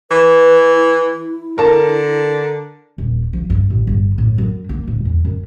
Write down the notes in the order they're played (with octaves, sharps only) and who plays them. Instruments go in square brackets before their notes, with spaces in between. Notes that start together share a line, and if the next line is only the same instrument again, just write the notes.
[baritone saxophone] E3 [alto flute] B4
[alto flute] E4
[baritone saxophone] D3 [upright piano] A#4 A5
[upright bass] D#1
F3
G2
A1
G1
A2
F#2
A#3
D1
E2
F#2